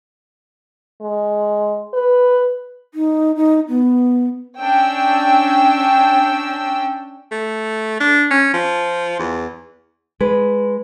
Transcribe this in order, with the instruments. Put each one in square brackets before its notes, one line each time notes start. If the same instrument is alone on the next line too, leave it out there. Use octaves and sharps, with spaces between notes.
[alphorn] G#3
B4
[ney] D#4
D#4
B3
[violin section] C#4 D4 G5 E6
[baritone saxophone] A3
D4
C#4
F3
E2
[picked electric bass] G#3 [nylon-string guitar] B4